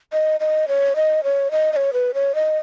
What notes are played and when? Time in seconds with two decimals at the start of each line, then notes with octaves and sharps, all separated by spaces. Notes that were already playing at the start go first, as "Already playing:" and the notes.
0.13 D#5
0.40 D#5
0.68 C#5
0.96 D#5
1.24 C#5
1.51 D#5
1.73 D#5
1.76 C#5
1.93 B4
2.14 C#5
2.35 D#5